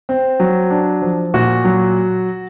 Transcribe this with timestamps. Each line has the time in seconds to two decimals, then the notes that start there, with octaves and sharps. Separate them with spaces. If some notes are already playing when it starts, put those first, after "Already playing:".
0.09 C4
0.40 F#3
0.70 D4
1.02 F3
1.34 A#2 F#4
1.65 F#3